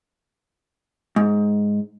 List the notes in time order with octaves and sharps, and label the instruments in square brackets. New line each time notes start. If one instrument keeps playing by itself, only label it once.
[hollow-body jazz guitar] G#2